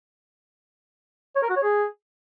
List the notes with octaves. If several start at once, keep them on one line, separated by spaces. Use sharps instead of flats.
C#5
A#4
F#4
C#5
G#4